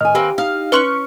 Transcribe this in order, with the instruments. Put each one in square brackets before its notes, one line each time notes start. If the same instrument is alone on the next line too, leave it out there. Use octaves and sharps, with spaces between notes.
[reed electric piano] A2 D#5 F6 [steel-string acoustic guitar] D#3 G#5
[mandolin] A#3 C4 B4 [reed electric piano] G4
[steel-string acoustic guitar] D#4 [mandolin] F5
[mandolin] C#4 C#6 F#6 [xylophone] B4 C6 F#7